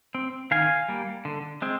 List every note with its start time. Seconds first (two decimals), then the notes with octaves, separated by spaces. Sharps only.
0.15 C4
0.51 D#3 F5 G#5
0.89 G3 A#3
1.25 D3
1.62 G#3 C4